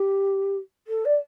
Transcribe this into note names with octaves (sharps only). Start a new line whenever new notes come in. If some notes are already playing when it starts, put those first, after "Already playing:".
Already playing: G4
A4
D5